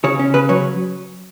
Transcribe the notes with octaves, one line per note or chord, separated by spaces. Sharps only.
C#3 C#5
C#4
C#3 B4
F#3 C#5